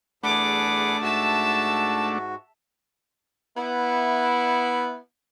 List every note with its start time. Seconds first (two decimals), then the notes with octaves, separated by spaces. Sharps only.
0.23 E2 A3 D4 G#4 F#5 B5 D6
1.02 G#2 F#4 E5 A5
3.57 B3 E4